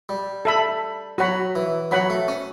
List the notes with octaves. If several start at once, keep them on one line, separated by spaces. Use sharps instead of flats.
G3
A4 E5 B5
F#3 F#4 C#5 F#5 B5
E3
F#3 F#4 C#5 F#5 B5
A3
C#4